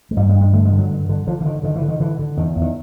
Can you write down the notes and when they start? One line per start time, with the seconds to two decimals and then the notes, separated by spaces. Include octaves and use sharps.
0.11 G#3
0.17 G2 G3
0.29 G#3
0.35 G2
0.41 G#3
0.53 D3 A3
0.65 G#3
0.72 D3
0.79 F#3
0.91 G2
1.09 D3
1.27 D3 F3
1.41 E3
1.45 D3 D#3
1.63 D3 D#3
1.76 E3
1.82 D3
1.88 D#3
2.00 D3 E3
2.19 D3
2.37 E2 D#3
2.56 E2
2.62 D#3